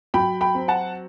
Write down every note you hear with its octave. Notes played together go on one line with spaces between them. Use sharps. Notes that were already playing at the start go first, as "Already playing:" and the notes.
F#3 G5 B5
G5 B5
C4
F#5 A5